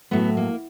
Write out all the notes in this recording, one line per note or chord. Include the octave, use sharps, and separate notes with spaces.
A2 F#3 A3 B3
A#3